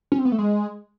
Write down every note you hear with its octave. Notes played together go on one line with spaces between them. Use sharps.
C#4
C4
B3
A3
G#3